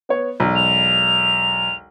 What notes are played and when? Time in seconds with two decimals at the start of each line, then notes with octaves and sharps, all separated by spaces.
0.09 B3 C#5
0.40 E1 B1
0.56 F7